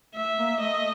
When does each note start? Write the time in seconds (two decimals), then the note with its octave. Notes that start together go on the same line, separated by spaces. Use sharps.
0.15 A3 E5
0.37 A#3
0.60 A3 D#5